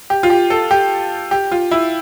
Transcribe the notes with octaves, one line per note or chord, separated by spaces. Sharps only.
G4
F4
G4
A4
G4
G4
F4
E4